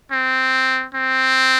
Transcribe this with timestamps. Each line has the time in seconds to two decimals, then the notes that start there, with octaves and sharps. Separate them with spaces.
0.11 C4
0.94 C4